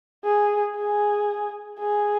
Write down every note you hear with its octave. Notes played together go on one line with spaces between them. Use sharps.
G#4
G#4
G#4